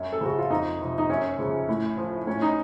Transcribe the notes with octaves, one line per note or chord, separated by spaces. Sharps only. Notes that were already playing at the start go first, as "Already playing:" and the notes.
Already playing: F#2 C#4
A4
C#3 F3 F#4
F4
F2 D#4
C3 F3
D#4
F#2 C#4
C#3 F3
A2
F3
A2 C#4
D#4